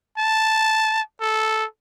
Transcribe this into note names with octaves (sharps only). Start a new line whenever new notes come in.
A5
A4